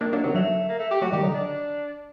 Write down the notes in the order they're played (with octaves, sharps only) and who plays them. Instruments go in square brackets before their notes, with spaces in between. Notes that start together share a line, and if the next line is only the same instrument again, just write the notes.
[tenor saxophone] D#3 [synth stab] A#3 D4
[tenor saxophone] F#3 [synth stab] A#3 D4
[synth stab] C3 D#3 [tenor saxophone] F#3
[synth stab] D3 F#3 [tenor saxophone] A3
[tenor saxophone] A#3
A3
G4
[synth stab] F#3 A3 [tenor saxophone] F#4
[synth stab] D#3 G3 [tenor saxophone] G4
[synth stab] D3 F#3 [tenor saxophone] D#4
[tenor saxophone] D4